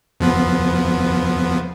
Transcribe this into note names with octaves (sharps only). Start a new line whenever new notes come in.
F2 F3 B3